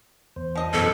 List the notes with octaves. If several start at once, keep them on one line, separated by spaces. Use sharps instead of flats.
E2 C5
F3 D#5
F#2 B2 E3 A4